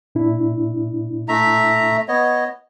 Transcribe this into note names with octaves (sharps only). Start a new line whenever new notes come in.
A#2 D4 E4
A3 E5 A#5
B3 C#5 D#5